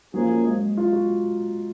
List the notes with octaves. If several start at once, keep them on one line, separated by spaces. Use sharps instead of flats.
F#2 F3 F#3 A#3 C#4 G#4
G#3
F4
F#4